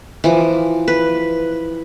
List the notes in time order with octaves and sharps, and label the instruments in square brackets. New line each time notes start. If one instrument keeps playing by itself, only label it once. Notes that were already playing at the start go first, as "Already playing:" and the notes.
[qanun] E3 F3 D6
B4